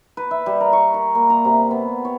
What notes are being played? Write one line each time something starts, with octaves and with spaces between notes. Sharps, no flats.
B4
E5
G3
A#4
C#6
A#4
A#3
A#5
C3
B3
C#5